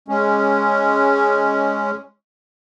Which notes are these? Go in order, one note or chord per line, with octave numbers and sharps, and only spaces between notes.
G#3 C#4